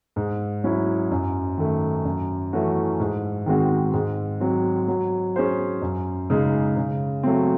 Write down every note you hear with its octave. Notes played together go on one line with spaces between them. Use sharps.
G#2
F#3 C#4 E4
F#2
D#3 A3
F#2
E3 A3 C#4 F#4
G#2
D#3 G#3 C4 F#4
G#2
F#3 C4
F#3
C#4 G#4 C5
F#2
C#3 G#3 D#4
C#3
F#3 A3 C4